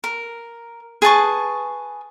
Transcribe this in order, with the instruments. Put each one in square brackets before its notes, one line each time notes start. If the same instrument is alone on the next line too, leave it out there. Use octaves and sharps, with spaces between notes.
[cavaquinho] A#4
G#4 B4 A5 C#6